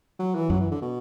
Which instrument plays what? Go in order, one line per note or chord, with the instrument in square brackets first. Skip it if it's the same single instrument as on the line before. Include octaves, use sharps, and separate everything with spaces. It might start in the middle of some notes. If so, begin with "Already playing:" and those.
[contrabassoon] F#3
E3
[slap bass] F#2 [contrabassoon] F#3
[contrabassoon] E3
D3
B2